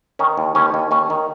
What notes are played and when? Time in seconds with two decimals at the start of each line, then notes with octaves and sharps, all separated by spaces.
0.19 D#3 C#4
0.37 D#2
0.55 D#2 C#4
0.74 D#2
0.91 D#2 C#4
1.10 D#3